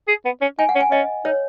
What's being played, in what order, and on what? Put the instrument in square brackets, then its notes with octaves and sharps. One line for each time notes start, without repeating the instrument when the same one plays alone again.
[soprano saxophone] G#4
B3
C#4
[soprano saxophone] D#4 [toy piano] G#5
[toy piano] F#5
[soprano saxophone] C#4
[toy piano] G#5
[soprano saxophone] C#4 [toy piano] D#5
[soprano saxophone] D#4 [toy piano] C#5